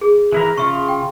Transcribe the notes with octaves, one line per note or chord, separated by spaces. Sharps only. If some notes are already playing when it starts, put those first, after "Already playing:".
G#4
E3 E4 A#4
C#3 F4 E5 C#6
G5